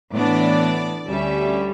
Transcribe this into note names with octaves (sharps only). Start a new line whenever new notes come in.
A2 E3 B3 D4 D5
D2 D3 G3 C#4 E5